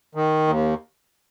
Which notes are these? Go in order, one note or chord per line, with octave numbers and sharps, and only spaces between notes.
D#3
D#2